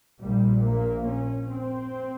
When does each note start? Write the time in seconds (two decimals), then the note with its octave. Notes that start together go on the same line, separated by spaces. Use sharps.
0.20 A#1 A#2 G3
0.63 A#3
1.07 C#4
1.50 C4